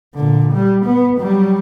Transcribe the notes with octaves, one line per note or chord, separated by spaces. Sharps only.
A#2 D3
G3
B3
F#3 G3